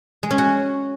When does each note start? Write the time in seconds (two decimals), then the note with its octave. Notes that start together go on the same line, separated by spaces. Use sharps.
0.23 G#3
0.31 C#4
0.38 F#4